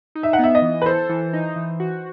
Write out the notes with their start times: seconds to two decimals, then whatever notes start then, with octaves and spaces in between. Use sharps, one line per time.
0.15 D#4
0.23 E5
0.33 F#5
0.39 B3 E5
0.55 D#5
0.62 E3
0.82 B4
0.86 A4 C5
1.09 E3
1.33 D#4
1.56 E3
1.80 F#4